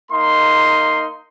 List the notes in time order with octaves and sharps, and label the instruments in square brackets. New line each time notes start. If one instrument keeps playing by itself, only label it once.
[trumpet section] A#3 D#4 C6